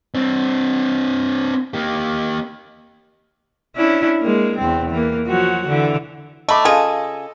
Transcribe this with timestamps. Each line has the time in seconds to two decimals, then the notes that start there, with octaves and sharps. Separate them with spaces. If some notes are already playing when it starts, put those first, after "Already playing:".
0.14 C4 D4
1.74 A#3 G4
3.76 C#4 D4 E4
4.21 G#3 A#3
4.57 E2 C4
4.90 E3 A#3
5.27 F3 F#3 F#4
5.68 D3 E3
6.49 A3 D#5 B5 D6
6.65 C#3 F4 G#4 A4 D#5 A5